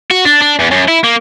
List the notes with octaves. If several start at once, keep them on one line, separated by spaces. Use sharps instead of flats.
F#4
D4
D4
E2
F#2
E4
A#3